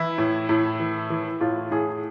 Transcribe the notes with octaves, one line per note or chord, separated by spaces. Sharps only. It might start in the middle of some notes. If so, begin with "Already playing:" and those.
Already playing: E3 E4
A2
A2
E3
E3
A2 F4
A2 G#4